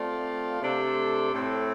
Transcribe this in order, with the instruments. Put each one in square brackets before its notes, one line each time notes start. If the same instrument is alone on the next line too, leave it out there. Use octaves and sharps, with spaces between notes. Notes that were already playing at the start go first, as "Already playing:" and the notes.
Already playing: [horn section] A3 C4 F4 D5 F5
C3 A3 D4 A4 C5
A2 A3 C4